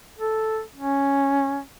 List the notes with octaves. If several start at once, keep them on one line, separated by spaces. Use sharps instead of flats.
A4
C#4